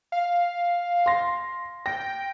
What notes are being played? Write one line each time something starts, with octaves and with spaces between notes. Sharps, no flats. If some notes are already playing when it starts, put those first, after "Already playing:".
F5
C6 A#6
G5 A#6